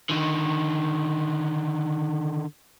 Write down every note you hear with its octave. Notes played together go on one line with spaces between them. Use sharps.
D3 D#3